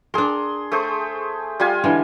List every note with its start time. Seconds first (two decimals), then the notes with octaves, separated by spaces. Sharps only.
0.14 D4 G#4 A#4 C6
0.72 A3 G#4 C5
1.60 G3 F4 G#5
1.84 D3 E3 G#3